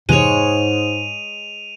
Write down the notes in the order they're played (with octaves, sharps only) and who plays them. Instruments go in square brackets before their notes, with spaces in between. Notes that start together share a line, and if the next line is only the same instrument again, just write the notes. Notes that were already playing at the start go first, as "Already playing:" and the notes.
[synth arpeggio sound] F2 C3 E3 [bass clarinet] G#2 [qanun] G#3 C#5 [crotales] D#7 F7